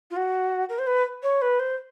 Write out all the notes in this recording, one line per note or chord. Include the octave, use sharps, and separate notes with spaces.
F4
F#4
A#4
C5
B4
C#5
B4
C5